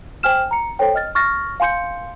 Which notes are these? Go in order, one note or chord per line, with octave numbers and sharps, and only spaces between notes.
C5 G5 G#5 F6 E7
A#5 C#7
A4 C5 C#5 G5
D#5 F6 A6
C#6 F6 A6 A#6
F5 G#5 C6 G6 C#7